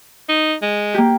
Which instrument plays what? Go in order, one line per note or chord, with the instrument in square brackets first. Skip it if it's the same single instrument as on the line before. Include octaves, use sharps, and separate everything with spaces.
[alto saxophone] D#4
G#3
[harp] A#3 G4